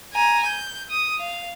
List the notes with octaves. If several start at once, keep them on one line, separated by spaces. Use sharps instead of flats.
G#5 A#5
G6
D#6
F5